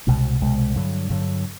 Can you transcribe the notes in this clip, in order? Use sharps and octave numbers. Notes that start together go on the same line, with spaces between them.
C2 B2 G#3
C2 B2 G#3
G2 D3 F#3
G2 D3 F#3